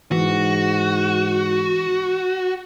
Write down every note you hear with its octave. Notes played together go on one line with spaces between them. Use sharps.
G#2 E3 F#4